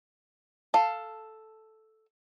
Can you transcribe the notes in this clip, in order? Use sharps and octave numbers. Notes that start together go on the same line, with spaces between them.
A4 F5